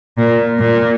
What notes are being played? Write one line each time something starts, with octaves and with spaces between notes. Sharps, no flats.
A#2
A#2